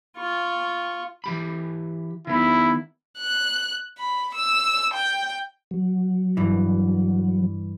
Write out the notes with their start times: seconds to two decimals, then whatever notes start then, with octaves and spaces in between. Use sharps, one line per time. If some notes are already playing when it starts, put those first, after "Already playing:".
0.17 F4 C#6
1.24 E3 G4 B5
2.27 D#3 B3 E4
3.18 F#6
3.98 B5
4.35 E6
4.94 G5
5.71 F#3
6.37 G2 E3